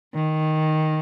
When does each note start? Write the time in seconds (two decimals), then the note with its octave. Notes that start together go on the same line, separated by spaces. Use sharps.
0.15 D#3